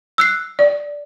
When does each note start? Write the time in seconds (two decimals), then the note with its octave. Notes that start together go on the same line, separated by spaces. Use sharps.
0.18 E6 F#6 C7
0.59 D5